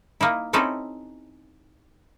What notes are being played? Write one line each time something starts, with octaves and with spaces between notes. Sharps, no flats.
A#3 D#4 E4
C4 C#4 D#4 E4 G4 A4